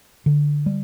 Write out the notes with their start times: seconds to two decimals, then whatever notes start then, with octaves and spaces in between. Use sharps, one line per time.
0.26 D3
0.66 G3